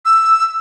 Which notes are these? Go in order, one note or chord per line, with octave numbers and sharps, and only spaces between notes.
E6